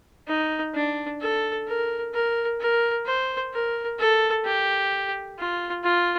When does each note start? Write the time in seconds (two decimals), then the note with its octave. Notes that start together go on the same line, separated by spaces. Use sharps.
0.27 D#4
0.74 D4
1.21 A4
1.67 A#4
2.13 A#4
2.60 A#4
3.05 C5
3.53 A#4
3.99 A4
4.45 G4
5.38 F4
5.84 F4